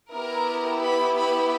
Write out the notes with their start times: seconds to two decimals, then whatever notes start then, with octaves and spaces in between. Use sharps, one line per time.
0.13 B3 E4 G4 A#4 A#5
0.82 B4 B5
1.15 B4 B5